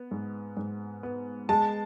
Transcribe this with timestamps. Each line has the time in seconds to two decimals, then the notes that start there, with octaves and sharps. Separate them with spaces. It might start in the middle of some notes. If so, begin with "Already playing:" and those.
Already playing: B3
0.11 G#2
0.57 G#2
1.03 B3
1.49 G#3 A5